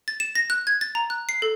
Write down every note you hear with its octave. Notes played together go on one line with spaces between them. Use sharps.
A6
E7
A#6
F#6
G#6
A6
A#5
F#6
C7
A4